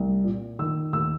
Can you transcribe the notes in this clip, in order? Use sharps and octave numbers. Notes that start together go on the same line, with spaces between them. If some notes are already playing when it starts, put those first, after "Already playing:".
Already playing: C2
A#2
D#3 E6
D#2 E6